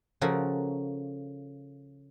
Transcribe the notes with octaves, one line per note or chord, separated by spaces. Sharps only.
C#3 F3 F#4 A4 A#4